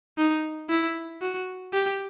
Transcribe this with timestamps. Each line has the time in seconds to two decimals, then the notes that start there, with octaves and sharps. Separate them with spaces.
0.18 D#4
0.69 E4
1.22 F#4
1.73 G4